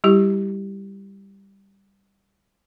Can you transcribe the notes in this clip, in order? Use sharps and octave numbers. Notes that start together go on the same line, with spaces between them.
G3 E4 G4